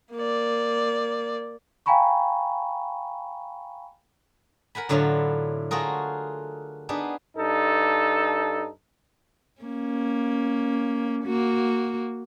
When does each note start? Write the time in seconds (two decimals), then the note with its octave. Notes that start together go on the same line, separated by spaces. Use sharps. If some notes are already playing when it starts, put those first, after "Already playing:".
0.13 A#3 D5
1.86 F5 G5 G#5 A#5 B5 C#6
4.75 A#4 F#5 G#5 B5
4.89 A2 D3 F#3 E4 F4
5.71 A3 F4 F#4 G#4 A#4
6.89 B3 D4 D#4 G#4
7.36 G2 D#4 A4
9.62 A#3 C#4
11.24 A#3 F#4